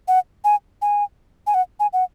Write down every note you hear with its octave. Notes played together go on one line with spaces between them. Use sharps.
F#5
G#5
G#5
G#5
F#5
G#5
F#5